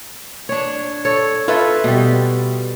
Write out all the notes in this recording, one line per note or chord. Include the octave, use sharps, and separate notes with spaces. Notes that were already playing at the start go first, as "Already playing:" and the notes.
D4 C#5
A4 C#5
F4 A4 B4 E5
B2 G3